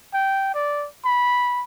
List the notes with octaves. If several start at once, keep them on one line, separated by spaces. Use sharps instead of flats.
G5
D5
B5